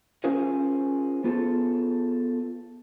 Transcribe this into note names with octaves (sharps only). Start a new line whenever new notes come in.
C#4 F4 G#4 A#4 C5
B3 F4 G#4 A4